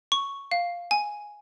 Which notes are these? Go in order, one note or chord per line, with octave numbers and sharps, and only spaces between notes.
C#6
F5
G#5